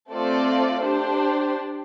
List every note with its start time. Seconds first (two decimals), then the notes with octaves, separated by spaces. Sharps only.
0.11 A3 C4 F4 A4 D5
0.83 D4 G4 C5